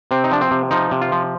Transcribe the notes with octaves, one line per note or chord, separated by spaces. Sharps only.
C3 C4
D#4
F3 D4
C4
C3
F3 D#4
C3
F4
F3